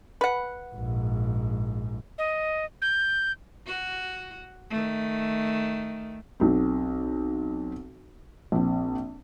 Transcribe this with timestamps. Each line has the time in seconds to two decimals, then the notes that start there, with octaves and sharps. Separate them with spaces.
0.21 B4 F#5
0.74 A#1 G#2
2.18 D#5
2.82 G6
3.67 F#4
4.70 D#3 A3
6.40 B1 C4
8.52 A#1 C4